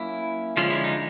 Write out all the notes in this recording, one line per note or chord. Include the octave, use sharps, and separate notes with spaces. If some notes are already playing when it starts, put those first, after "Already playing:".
Already playing: F#3 A#3 C#4 E4
D3 F3 G#3 C#4 F4
E4
D#4